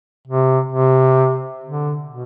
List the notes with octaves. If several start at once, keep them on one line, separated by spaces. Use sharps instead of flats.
C3
C3
D3
B2